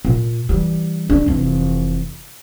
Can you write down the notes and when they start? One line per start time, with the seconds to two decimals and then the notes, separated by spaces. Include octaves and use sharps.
0.05 A#2
0.49 E3 G3
1.10 D4
1.26 F1 E3